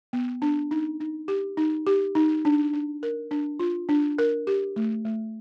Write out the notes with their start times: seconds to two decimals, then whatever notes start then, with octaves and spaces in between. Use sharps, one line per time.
0.13 B3
0.42 D4
0.71 D#4
1.00 D#4
1.28 G4
1.57 D#4
1.87 G4
2.15 D#4
2.45 D4
2.73 D4
3.03 A#4
3.31 D4
3.59 F4
3.89 D4
4.18 A#4
4.47 G4
4.76 A3
5.05 A3